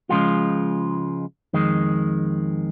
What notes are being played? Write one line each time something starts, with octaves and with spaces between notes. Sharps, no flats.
C#2 C#3 F3 G#3 F4
F2 D#3 G#3